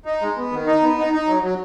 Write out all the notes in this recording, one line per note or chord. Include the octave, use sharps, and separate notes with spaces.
D#4
G#3
B3
D#3
D#4
B3
D#4
D#4
F#3
F#3